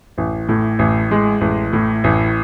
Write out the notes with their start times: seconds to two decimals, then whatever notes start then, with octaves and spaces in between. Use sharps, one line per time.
0.18 A1
0.48 A2
0.79 A1
1.11 G#3
1.41 A1
1.73 A2
2.04 A1